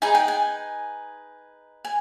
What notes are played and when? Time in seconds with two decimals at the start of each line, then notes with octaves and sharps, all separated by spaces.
0.02 D#4 G#4 B4 G#5
0.15 G5
0.28 G#5
1.85 G#5